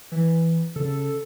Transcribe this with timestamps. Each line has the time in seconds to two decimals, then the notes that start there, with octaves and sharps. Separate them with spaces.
0.12 E3
0.76 C#3 A4